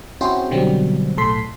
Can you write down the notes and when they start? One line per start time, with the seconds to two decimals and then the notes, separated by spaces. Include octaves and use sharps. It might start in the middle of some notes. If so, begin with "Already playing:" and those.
0.21 C4 C#4 E4 F#4 G#4 C5
0.51 B2 D3 F#3 G3 C4
1.17 B1 A2 A4 C6 B6